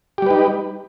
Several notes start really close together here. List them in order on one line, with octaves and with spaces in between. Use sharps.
G4 G3 B4 D#4